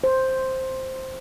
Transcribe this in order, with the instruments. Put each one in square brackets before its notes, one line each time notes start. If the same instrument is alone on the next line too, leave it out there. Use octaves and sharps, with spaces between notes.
[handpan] C5